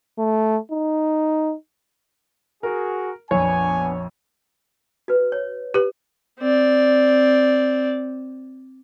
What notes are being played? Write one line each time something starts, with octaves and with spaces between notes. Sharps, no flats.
A3
D#4
F#4 G#4 A#4
A#1 F2 B3 D4 C#5 G#5
F#4 B4
C#5
G4 B4
C4 D5